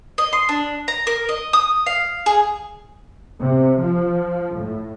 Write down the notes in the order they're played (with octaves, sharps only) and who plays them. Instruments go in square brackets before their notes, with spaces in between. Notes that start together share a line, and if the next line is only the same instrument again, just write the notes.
[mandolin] D#5
C6
D4
A#5
A#4
D#5
D#6
F5
G#4
[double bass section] C3
F3
A2